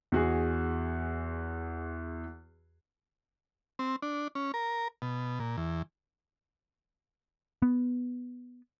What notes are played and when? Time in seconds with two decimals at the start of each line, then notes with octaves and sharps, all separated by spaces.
0.12 E2 F#4 G#4
3.79 C4
4.02 D4
4.35 C#4
4.54 A#4
5.02 B2
5.40 A#2
5.57 E2
7.62 B3